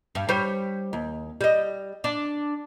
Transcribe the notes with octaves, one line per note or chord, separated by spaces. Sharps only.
G2
G3 C5 C#5
D#2
G3 D#5
D4